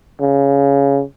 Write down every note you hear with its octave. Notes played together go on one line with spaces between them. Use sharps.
C#3